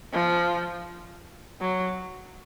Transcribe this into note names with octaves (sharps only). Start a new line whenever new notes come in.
F3
F#3